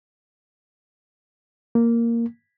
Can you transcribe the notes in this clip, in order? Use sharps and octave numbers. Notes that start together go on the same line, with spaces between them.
A#3